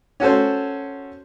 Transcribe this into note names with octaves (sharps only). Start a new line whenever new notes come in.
C#4 F#4 A4 C5